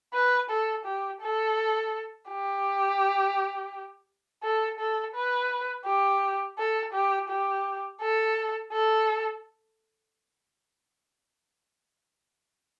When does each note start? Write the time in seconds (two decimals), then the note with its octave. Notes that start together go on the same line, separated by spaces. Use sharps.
0.14 B4
0.50 A4
0.85 G4
1.21 A4
2.29 G4
4.43 A4
4.79 A4
5.15 B4
5.86 G4
6.58 A4
6.93 G4
7.29 G4
8.01 A4
8.72 A4